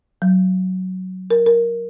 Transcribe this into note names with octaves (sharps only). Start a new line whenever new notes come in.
F#3
A#4
A#4